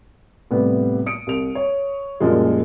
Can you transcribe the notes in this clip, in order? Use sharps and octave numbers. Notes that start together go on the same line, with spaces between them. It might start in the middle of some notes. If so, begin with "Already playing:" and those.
A2 C3 G3 B3
D#6 C#7 D7
C2 F7
C#5
F#2 A#2 F3 G3 G#3